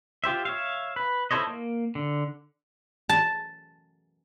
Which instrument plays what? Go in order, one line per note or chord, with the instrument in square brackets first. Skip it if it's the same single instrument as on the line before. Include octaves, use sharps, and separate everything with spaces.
[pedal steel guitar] F4 G4 C5 E5
C#5 E5 F5
B4
E4 A4 C5 C#5 D#5
A#3
D3
[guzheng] A5